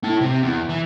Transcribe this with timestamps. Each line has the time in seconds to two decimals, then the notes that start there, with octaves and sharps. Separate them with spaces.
0.04 E4 A4
0.21 C3 C4
0.43 E2
0.70 E3